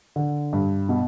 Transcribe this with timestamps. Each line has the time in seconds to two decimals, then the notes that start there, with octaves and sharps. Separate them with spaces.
0.16 D3
0.53 G2
0.89 B2